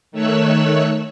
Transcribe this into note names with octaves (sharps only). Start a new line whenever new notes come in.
D#3 A3 C#5 E6 F#6